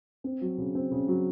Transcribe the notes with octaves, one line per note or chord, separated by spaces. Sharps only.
C4
F#3
C#3
C4
C#3
F#3